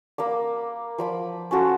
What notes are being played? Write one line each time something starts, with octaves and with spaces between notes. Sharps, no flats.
A#3 B5 D6
F3 B5 D6
C#4 F4 F#4 A4